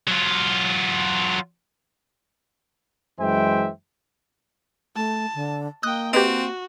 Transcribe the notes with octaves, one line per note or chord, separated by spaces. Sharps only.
F#3 F4
F#2 E3 G#3 C5 E5 G5
A3 A5
D3
A#3 D#5 G5 D#6 F#6
C4 F#4 G4 B4 D#5